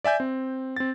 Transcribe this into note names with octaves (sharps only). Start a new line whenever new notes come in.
D5 E5 G#5 G6
C4
C4 A6